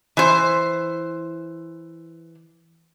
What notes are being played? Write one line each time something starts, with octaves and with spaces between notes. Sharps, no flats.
E3 C5